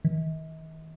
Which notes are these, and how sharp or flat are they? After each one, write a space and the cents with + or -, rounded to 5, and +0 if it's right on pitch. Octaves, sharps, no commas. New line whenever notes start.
D#3 +45